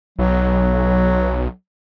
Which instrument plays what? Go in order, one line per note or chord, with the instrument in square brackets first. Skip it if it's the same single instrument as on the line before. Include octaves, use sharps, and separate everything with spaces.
[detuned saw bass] B1 [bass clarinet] F#3